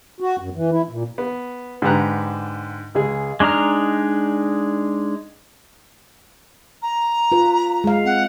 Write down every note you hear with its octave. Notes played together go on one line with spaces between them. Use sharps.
F#4
F#2
E3
E4
A#2
B3
G#2 D3 G4 B4 A#5 F#6
C#2 G#3 G#4
G#3 D4 D#4 A#5 F6
A#5
F4 B4
G#3 F5
C4 F#5